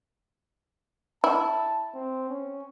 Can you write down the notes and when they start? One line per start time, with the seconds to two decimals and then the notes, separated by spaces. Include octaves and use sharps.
1.24 E4 A5
1.95 C4
2.30 C#4